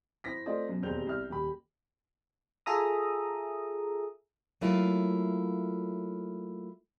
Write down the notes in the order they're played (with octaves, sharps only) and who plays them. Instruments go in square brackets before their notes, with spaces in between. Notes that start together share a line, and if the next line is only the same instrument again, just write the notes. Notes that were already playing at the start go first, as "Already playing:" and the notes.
[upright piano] F2 C4 E4 A#6 B6
A3 C4 F4 C5 D5 D#5
F#2 B2
E1 D#2 C4 G4 G6 F7
C2 E5 F6
D#1 G4 B5
[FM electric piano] F4 G#4 A4 E5 A#5 D#6
[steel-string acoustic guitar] F#3 A3 A#3 E4 F4 F5